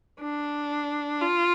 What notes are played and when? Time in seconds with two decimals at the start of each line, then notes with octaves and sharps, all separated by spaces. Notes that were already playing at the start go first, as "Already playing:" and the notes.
0.21 D4
1.21 F4